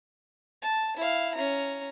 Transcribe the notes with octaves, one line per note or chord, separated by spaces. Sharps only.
A5
E4 F5
C#4 A#5